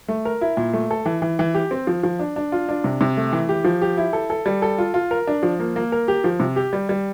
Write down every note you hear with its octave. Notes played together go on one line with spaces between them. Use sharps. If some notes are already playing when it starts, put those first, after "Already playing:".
A3
A#4
E4
A#2
A3
A4
E3
E3
E3
G4
C4
F3
F3
D4
D4
F4
D4
C3
C3
A3
E3
G4
F3
G4
E4
A4
A4
G3
A4
F4
F4
A#4
D4
F3
A#3
A#3
A#4
G4
F3
C3
G4
G3
G3